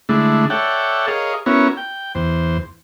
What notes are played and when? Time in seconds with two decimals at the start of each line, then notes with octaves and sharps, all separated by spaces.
0.09 D3 G#3 A3 D4 E4
0.50 A4 C#5 D5 E5 F#5 G5
1.08 G#4 A#4 C#5 D#5 F5
1.46 B3 C#4 E4 F#4 A#4 C#5
1.77 G5
2.15 E2 C5